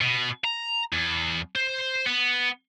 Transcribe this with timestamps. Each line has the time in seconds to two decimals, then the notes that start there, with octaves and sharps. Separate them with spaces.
0.01 B2
0.45 A#5
0.92 E2
1.56 C5
2.06 B3